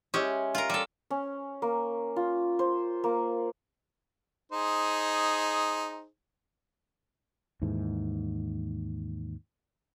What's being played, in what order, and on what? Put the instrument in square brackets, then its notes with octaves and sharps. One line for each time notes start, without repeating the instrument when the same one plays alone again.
[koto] G#3 C#4 [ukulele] G4 C#5 E5
[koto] F4 A#4
G3 A4
[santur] C#4
A#3
F4
C5
A#3
[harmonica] D#4 G#4 C5
[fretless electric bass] D#2 G#2 E3